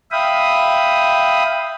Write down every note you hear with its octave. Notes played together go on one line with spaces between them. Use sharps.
E5 F5 G5 B5 D#6